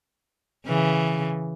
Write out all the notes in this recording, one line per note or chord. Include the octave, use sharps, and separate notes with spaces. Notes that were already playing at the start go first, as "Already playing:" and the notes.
C#3 E3